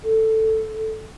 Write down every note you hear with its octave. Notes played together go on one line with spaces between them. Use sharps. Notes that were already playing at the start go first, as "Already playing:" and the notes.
A4